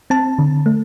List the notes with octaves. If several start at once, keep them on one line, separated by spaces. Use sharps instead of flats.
C4 A5
D3
A3